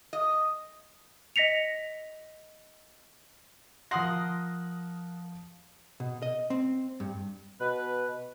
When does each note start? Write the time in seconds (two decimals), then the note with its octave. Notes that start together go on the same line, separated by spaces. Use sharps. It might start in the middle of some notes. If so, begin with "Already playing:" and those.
0.13 D#5
1.36 D#5 A#6 B6 C#7 F7
3.91 F3 A#4 F#5 C6 D#6 A#6
6.00 B2
6.22 D#5
6.50 C4
7.00 G2
7.60 B2 B4